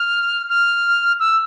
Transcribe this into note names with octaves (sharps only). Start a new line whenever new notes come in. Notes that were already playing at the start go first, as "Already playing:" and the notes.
Already playing: F6
F6
E6